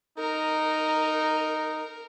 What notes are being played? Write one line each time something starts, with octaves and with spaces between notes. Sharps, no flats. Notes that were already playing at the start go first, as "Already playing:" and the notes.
D#4 A#4